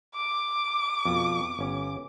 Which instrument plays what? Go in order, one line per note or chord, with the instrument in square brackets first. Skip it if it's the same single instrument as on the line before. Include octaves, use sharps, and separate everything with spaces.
[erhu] D6
[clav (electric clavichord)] F2 B2
G1 C#4